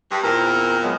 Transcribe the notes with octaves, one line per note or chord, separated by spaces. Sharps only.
G2
E2 A#2 C4 A#4 A#5
F#3 G#3 B3